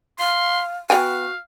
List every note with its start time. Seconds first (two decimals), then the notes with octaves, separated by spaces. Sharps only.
0.19 F5 C6
0.90 B3 F#4 F5 G5 G#5